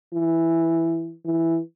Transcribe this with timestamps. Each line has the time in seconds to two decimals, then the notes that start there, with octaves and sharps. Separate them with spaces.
0.14 E3
1.25 E3